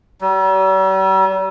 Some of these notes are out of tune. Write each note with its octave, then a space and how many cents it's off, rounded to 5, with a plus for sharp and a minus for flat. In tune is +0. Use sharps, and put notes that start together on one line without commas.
G3 -45